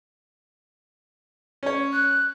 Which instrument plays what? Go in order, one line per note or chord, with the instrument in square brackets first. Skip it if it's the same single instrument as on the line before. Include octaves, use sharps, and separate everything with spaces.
[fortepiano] C#4 C#5
[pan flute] F#6